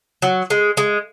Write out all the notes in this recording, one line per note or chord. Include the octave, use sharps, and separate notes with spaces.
F#3
G#3
G#3